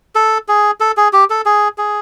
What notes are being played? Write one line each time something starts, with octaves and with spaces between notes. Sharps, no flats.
A4
G#4
A4
G#4
G4
A4
G#4
G#4